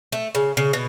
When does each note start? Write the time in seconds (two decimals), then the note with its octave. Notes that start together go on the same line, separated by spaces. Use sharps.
0.12 A3
0.35 C#3
0.57 C#3
0.73 B2